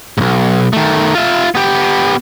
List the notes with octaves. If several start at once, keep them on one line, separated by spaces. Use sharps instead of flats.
B1 G#2
D#3 A3
F4 E5
B3 G4